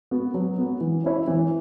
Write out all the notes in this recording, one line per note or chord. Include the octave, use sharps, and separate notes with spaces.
B3 F#4
F#3
B3 F#4
E3
C#4 E4 C#5
E3